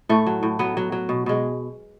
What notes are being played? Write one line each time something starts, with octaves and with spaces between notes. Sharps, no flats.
A2 A3
F#3
A2
F#3 B3
F#3
F#3
B2
B2 G#3